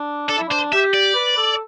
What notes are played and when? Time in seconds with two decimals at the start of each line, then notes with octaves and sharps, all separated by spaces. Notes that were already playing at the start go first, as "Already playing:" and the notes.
Already playing: D4
0.29 D4 A4
0.38 E4
0.49 D4 C5
0.72 G4 E5
0.94 D5
1.15 B4
1.37 A4